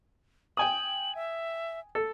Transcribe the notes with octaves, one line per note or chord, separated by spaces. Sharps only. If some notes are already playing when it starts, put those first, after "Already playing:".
G5 G#5 D#6 F#7
E5
A4